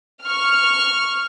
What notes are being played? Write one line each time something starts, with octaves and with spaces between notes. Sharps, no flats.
C#6 F6